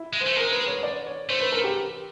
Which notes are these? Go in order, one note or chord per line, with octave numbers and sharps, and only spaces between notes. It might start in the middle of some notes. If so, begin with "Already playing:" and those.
Already playing: E4
G#3
C5
A3
G#3 A#4
B4
C#5
D5
C#5
A3 C5
B4
A#4
G4